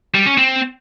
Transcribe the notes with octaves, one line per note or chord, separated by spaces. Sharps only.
G3
C#4
C4